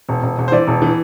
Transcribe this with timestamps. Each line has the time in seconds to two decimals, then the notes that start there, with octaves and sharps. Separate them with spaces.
0.09 E1
0.23 E1
0.38 E1
0.48 C5
0.52 E3 D5
0.67 E1
0.82 E3